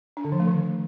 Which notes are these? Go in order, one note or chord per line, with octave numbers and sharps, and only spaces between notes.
D4
D3
F3
A3
D#3